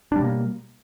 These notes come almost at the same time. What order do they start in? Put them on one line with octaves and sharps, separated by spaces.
D4 G3 B2 A#3